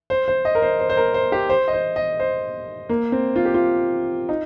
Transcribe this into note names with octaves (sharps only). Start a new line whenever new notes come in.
C5
C5
D#5
A#4
C5
C5
C5
A#4
C5
G4
C5
D#5
C5
D#5
C5
A#3
C4
F4
G4
F4
D#4